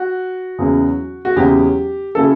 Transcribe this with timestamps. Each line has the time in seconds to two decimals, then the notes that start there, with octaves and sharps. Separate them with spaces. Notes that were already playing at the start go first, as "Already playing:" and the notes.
Already playing: F#4
0.58 E2 C#3 F#3 C#4 E4
1.25 F#4
1.36 E2 C#3 F#3 C#4 E4 G4
2.15 C#3 F#3 C#4 E4 A4